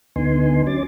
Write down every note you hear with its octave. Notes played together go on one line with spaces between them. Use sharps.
D2 D3 B3 D#4 G#5 C6
F#3 C#4 D6 A6